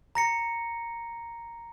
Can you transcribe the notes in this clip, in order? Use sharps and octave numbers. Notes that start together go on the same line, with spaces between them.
A#5 A#6 C#7